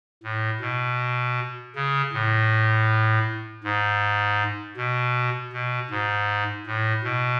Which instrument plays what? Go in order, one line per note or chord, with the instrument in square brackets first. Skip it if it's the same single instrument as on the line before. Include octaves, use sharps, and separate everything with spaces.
[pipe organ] A2
B2
C#3
A2
G#2
B2
B2
G#2
A2
B2